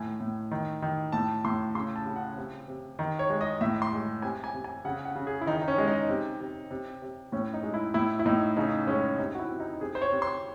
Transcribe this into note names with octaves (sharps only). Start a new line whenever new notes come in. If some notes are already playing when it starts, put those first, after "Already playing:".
Already playing: A2 D#3 A3 G#5
A2
D#3
D#3
A2 A5
A2 C6
C#3 C6
A5
C#3
F#5
C3
C3
D#3
C#5
G#3
D#5
A2 E5
C6
G#3
C3 G#5
G#5
C3
G#5
C#3 F#5
F#5
C#3
G#4
E4
D#3 D#4
D#4
C#4
G#3
D#4
C3
C3
C3
C3
A2 C#4
D#4
G#3
E4
A2 E4
E4
A2 D#4
C#3 D#4
G#3 C#4
C3 D#4
F#4
E4
C3
D#4
C3 G#4
C5
C#5
C3
C6